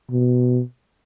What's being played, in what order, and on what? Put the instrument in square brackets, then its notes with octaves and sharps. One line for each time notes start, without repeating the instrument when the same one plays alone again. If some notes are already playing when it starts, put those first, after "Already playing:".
[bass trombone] B2